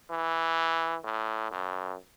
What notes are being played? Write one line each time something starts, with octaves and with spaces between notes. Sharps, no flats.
E3
A2
F#2